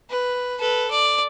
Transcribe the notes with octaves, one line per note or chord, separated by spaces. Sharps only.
B4
A4 B4
D5